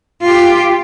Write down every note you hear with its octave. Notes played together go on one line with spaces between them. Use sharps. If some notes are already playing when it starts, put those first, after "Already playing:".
F4 G4